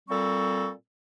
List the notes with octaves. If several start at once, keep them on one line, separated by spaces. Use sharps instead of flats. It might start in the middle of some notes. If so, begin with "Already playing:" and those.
A#2 G3 C4 A4 C#6